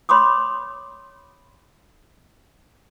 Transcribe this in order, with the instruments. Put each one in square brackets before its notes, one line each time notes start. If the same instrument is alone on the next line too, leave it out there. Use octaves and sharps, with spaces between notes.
[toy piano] C#5 B5 C6 D6 D#6